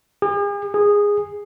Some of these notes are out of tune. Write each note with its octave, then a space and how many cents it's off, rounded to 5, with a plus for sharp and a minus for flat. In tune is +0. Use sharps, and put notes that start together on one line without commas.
G#4 -45
G#4 -15